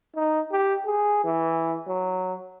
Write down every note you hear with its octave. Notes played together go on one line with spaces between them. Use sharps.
D#4
G4
G#4
E3
F#3